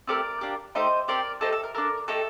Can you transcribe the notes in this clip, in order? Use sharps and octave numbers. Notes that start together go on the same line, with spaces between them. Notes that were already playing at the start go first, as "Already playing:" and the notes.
A3 C4 G4 A#4 D5
A#3 D4 G4
A3 D#4 G4 C5 D#5
C4 G4 A#4 D5
A3 D#4 G4 A4 C5
A4
A#4
D4 A4 A#4
A3 D#4 G4 A4